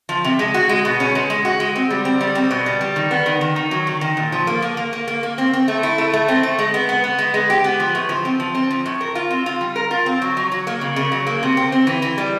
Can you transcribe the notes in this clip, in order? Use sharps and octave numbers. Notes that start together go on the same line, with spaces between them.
F3
C3
G#3
F#4
G#3
B2
C#4
G#3
G#3
F#4
G#3
C4
G3
C4
G3
C4
B2
G3
G3
D#3
B3
D#3
D#3
D#3
F#3
D#3
D#3
A#2
F3
A#3
A#3
A#3
A#3
A#3
A#3
C4
C4
A3
E4
A3
A3
C4
A3
G#3
B3
B3
B3
G#3
G#3
G4
B3
F3
A2
F3
C4
F3
C4
F3
A2
A#4
F4
C4
F4
G3
A#4
F4
C4
F#3
F#3
F#3
A#3
C#3
C#3
F#3
A#3
C3
C4
C4
E3
E3
G3